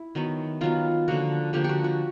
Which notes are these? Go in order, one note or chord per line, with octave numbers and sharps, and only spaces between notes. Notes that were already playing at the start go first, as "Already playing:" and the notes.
Already playing: E4
D#3 F#3 B3
D#3 F#3 B3 F4
D3 F3 A#3 F#4
D3 F3 A#3 G4
F#4 G4
F#4